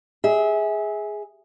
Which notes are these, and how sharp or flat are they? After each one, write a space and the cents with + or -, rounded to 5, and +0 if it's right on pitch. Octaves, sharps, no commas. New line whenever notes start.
G#4 +0 E5 -25